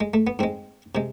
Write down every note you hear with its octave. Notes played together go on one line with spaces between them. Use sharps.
G#3
A3
B3
G#2 G#3 C4
C3 G#3